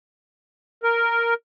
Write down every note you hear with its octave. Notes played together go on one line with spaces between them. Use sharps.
A#4